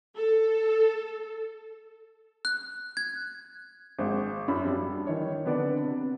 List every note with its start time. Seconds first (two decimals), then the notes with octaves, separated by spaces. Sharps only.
0.16 A4
2.45 F#6
2.97 G#6
3.99 G#1 G#3 C5
4.48 F#2 D4 E4 B5
4.65 G3 D4
5.07 D#3 E3 C#5
5.45 D3 B3 C4 D4 B4 D5
5.84 C3